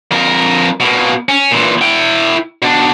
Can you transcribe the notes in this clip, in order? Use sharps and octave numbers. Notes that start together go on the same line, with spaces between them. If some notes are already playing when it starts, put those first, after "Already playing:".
F2 A#4
B2 A#3
C#4
A#2 E3
E4 G5
B2 D4